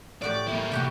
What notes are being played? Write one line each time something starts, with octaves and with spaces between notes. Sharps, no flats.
A2 F#4 G4 D5
A#3 E4
C2 F#4 G4 G5